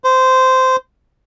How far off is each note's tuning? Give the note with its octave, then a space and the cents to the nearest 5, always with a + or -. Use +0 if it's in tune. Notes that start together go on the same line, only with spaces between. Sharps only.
C5 -15